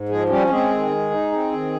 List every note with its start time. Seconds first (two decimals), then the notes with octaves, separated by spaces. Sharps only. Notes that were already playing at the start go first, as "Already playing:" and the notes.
Already playing: G#2
0.09 F3 G#3 G#4
0.29 G3 C#4 G4
0.50 G#3 C4 G#4
0.71 D#3
0.90 G#3
1.11 D#4
1.32 C4
1.52 D#3